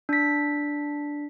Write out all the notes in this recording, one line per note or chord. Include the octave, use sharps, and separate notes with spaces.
D4 B6